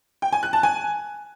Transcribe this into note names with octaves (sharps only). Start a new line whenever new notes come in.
G5
G#5
F#6
A5
G#5